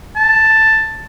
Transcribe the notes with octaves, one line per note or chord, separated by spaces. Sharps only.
A5